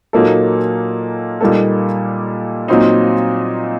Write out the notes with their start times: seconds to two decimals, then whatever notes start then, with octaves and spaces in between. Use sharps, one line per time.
0.13 A#2 F#3 A#3 D#4 A4
1.41 A#2 G3 A#3 D#4 A4
2.68 A#2 F#3 C4 D#4